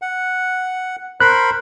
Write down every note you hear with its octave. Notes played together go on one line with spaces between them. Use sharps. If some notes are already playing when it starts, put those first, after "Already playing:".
F#5
A#4 C5 B5 F#6